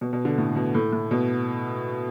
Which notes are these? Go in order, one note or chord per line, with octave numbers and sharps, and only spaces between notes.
B2
B2
D3
A2
B2
A2
A2
B2